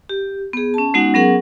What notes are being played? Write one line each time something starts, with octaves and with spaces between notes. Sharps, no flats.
G4
B3 G#4
C#4 A5
G#3 B3 C#4 D#4 F#4 F#5
F#3 B3 C#4 G#4 A#4 F#5